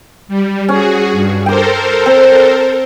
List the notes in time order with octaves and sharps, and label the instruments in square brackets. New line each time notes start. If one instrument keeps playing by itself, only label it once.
[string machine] G3
[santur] C#4 [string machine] F#4 G#4
[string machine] G2
[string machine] A4 A#4 C5 [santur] G5 D6
[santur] C4